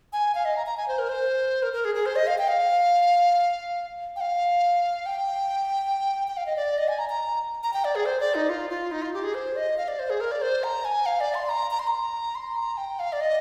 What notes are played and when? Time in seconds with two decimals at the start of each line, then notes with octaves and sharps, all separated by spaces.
0.13 G#5
0.35 F5
0.45 D#5
0.56 A#5
0.66 A#5
0.77 G#5
0.88 C5
0.99 A#4
1.09 C5
1.63 A#4
1.73 A#4
1.85 G#4
1.95 G#4
2.06 C5
2.16 D#5
2.27 F5
2.38 G5
2.48 F5
4.16 G5
4.21 F5
5.06 G5
6.28 G5
6.37 F5
6.46 D#5
6.56 D5
6.78 D#5
6.88 G#5
6.99 A#5
7.10 A#5
7.63 A#5
7.73 G5
7.85 D5
7.95 G#4
8.06 C5
8.20 D5
8.35 D#4
8.49 F4
8.70 F4
8.92 D#4
9.02 F4
9.14 G4
9.24 G#4
9.35 C5
9.56 D#5
9.78 F5
9.88 D5
9.99 C5
10.10 G#4
10.20 A#4
10.31 D5
10.42 C5
10.64 A#5
10.85 G#5
11.06 F5
11.21 D5
11.35 C6
11.49 A#5
11.71 A#5
11.79 C6
11.87 A#5
12.35 C6
12.56 A#5
12.77 G5
12.99 F5
13.13 D5
13.21 D#5